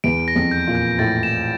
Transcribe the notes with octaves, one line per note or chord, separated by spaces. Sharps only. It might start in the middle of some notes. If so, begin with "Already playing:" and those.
E2 D7
A#6
F2
G6
A#2
G6
A2 A6
E7